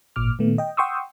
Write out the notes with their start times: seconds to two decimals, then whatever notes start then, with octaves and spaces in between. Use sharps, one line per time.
0.16 G#1 A#2 D6 F6
0.39 A#2 D#3 A3 B3
0.58 D#5 G5
0.77 F#5 G5 C6 C#6 D#6 E6